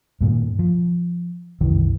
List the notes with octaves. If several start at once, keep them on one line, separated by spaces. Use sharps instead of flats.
G2 A#2 D#3
F3
C2 F#2 D#3 E3